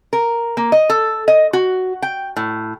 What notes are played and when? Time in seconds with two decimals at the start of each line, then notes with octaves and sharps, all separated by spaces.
0.13 A#4
0.57 A#3
0.72 D#5
0.90 A4
1.28 D#5
1.53 F#4
2.02 G5
2.36 A2